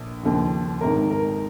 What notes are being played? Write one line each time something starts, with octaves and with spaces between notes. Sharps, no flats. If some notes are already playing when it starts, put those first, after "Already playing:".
Already playing: A#1
D#2 C#3 F3
G#1 G#2 D#3 A#4
A#4